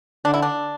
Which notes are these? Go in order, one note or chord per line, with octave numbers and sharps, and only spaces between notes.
D3 D4
E4
D4